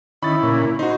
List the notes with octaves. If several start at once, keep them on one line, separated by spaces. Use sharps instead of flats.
D#3 C#4 E4 B5 A6
A#2 C#3
D#4 F#4 C5